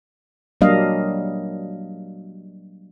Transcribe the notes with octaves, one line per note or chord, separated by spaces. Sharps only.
F#3 G3 A#3 D4 D#5 F5